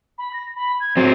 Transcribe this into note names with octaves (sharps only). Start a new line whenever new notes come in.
B5
A#6
B5
G#6
F#3 C4 A6